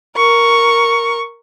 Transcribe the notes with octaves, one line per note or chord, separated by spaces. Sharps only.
A#4 C#6